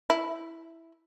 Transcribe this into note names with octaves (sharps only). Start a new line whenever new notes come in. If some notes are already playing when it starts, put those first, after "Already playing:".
E4